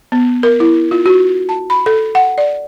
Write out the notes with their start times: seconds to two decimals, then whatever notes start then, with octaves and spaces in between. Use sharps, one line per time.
0.12 B3
0.43 A#4
0.60 E4
0.91 F4
1.06 F#4
1.49 A5
1.70 B5
1.86 A4
2.15 F#5
2.38 D5